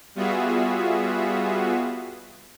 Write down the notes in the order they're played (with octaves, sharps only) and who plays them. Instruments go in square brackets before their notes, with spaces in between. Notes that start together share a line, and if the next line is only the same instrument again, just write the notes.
[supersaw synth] G3 B3 F4 F#4 G#4 E5